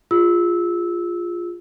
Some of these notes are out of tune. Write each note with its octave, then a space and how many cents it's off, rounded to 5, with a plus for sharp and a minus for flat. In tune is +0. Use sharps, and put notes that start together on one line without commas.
F4 +0 G#4 -30 E6 -15